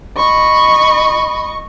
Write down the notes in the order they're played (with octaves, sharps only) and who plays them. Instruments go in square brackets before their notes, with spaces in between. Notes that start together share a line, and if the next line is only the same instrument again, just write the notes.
[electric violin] D#5 C#6 [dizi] B5